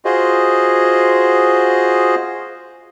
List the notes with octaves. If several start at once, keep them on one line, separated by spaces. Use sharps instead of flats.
F4 F#4 G#4 C5 D#5